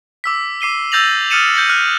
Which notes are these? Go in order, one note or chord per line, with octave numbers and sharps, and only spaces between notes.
D6 E6 B6
D6 C7 D#7 G7
E6 G6 A6 A#6 F7 F#7
D#6 F6 A6 C#7 D#7 E7
G6 A#6 C#7 F#7
F6 F#6